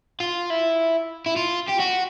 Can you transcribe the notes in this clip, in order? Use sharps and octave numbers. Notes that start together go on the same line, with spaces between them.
F4
E4
E4
F4
G4
F#4